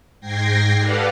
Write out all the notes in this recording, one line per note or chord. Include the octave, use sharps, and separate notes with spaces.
G#2 G5 G#6 A#6 C7
G4 A4 B4 D5 F5 F#5